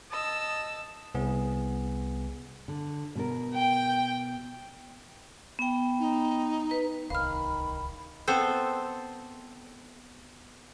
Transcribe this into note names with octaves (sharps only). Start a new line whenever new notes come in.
D#5 A5 E6
C2 B3 G#4
D3
B2 B3 A#4
G5
B3 G5
D#4
B4
D1 C2 D#3 F5 B5 F6
B3 C4 A4 C5